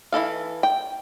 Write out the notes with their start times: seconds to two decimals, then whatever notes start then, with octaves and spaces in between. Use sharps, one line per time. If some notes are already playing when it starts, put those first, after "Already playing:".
0.12 E3 E4 A4 F5
0.63 G5